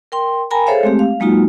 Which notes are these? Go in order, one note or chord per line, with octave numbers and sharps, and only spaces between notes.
A#4 G5 C6
A#4 G5 G#5 A#5 B5
G#4 A4 C5 C#5 E5 F5
G#3 A3 C4 G4
F5
F#3 G#3 A#3 D#4 F4 F#4